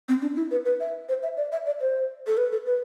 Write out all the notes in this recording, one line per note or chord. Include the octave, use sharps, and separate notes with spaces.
C4
D4
E4
B4
B4
E5
C5
E5
D5
E5
D5
C5
A4
B4
A4
B4